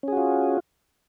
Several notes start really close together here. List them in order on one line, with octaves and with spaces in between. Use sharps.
C#4 G#4 F#4 F4